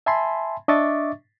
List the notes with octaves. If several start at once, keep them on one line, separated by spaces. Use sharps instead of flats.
E5 G#5 A5 B5 C6
D4 D#5 E5 C#6 D6 A6